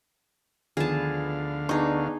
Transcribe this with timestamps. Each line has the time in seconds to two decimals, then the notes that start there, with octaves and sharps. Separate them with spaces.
0.77 D2 D3 D#3 F3 B3 G#4 F5 A5
1.69 B3 D4 D#4 G#4 C#6